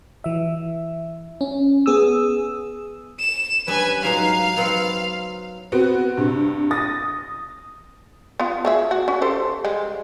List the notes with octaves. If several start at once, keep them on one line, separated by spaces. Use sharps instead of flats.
E3 E5
C#4
B3 G#4 D#6 E6
E7
G2 C#4 B4 G#5
G#2 F#3 D#4 F5
F#3 B3 C4
B3 C4 F#4
G2 C3
D#6 A6 A#6
B3 F4
A3 G#4 E5
F#4
C#4
G4 A4 C5
G3 G#3